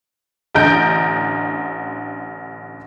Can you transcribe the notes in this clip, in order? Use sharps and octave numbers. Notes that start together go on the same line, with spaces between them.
A1 D3 D#5 A#5 G6 D7